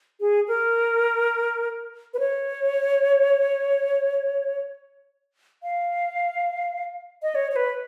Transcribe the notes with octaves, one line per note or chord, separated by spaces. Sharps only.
G#4
A#4
B4
C#5
F5
D#5
C#5
C#5
B4